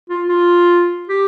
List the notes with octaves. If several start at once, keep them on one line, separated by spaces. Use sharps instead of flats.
F4
F4
G4